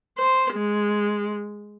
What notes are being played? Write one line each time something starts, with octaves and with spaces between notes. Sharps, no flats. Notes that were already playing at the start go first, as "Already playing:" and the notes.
C5
G#3